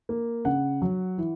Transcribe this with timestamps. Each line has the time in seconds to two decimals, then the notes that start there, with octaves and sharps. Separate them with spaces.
0.09 A#3
0.45 C#3 F#5
0.82 F#3
1.18 E3